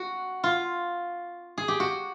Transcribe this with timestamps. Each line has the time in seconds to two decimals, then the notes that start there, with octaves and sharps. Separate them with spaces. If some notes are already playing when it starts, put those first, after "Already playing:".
Already playing: F#4
0.43 F4
1.58 G#4
1.68 G4
1.80 F#4